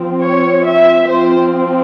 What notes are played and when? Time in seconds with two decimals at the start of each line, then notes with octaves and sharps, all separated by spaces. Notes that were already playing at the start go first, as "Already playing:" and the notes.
Already playing: F3 C4
0.22 C#5
0.65 E5
1.09 F3 C4 C5